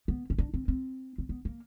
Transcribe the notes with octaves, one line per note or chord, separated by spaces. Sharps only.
B3
C#4
D4
C4
C4
C4
B3
A#3